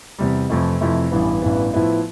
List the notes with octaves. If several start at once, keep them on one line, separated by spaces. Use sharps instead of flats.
E2 C3 G3
F2 C3 E3 A3 E4
F2 C3 E3 A3 E4
A1 G2 E3 B3
A1 G2 E3 B3
A2 F3 B3 E4